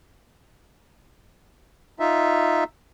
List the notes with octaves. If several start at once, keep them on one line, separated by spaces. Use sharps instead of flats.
D#4 F4 E5